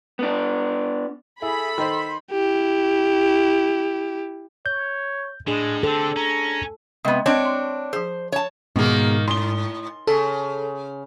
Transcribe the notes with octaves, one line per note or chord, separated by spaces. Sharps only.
B3 D4
E4 G#4 A4 B5
D#3 D#4 C5 C6
E4 G4
C#5 G6
A2 G#3 D4 G#4
D3 C4 A4
C#4 A#5
C3 G#3 B3 D#5 G5
C4 D4 C#5 D#5
C6
F3 G#4 C5
C#5 A5
G#2 B2 D#3 G#3 A#3
A2 C6 G7
C#3 A4